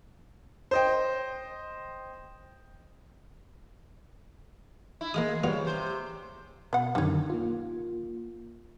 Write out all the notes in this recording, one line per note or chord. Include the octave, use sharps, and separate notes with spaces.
C5 D#5 G5
E4
G#3 A#3 F5 D#6
C#3 G3 B3 F4
C3 C5
B2 B3 F#5
F#2 D3 D#3 G3 C#4
A#3 F4